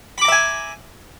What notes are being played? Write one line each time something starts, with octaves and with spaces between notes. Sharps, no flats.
E5 G#5 A#5 B5 D6